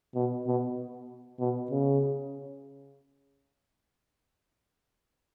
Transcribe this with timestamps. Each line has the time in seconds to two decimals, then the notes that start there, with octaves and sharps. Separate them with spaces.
0.15 B2
0.47 B2
1.40 B2
1.71 C#3